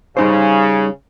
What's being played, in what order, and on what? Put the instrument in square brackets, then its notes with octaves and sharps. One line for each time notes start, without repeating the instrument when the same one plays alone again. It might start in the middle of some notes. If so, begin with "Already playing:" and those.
[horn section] C#3 [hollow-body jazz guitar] G3 D#4 C5